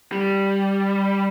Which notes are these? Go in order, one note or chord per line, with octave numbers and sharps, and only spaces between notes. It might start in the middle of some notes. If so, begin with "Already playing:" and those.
G3